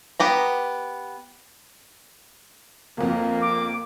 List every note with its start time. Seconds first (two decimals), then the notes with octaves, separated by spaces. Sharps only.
0.20 B3 G4 A#5
2.97 G1 F2 A#3
3.41 D6